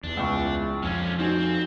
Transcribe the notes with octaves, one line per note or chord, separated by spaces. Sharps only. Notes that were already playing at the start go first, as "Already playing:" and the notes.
E2 D4
C#2 C#6
F2 D3 C#4 F6
C4 D#4 F#4 G#5